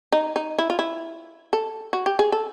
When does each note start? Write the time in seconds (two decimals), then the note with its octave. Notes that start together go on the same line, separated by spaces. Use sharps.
0.12 D#4
0.36 D#4
0.59 E4
0.70 F4
0.79 E4
1.53 A4
1.93 F#4
2.06 G4
2.19 G#4
2.32 A4